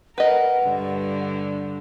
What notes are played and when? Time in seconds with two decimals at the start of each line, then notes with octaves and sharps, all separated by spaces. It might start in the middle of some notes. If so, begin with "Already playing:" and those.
0.18 A#4 B4 D#5 F#5
0.62 G2 D3